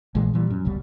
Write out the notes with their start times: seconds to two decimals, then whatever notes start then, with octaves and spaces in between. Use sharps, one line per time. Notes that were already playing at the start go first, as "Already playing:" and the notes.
0.15 A#1 A#2 E3 G#3
0.34 A#2 E3 G3
0.50 F#2
0.65 F1 C#2 B2 G3